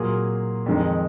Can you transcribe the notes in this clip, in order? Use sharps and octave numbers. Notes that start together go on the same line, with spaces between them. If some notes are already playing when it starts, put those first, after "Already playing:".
Already playing: A#2 F#3 A#3 F4 G#4
F2 D#3 G#3 D#4